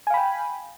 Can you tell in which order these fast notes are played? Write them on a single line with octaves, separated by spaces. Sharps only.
G#5 F5 B5 G5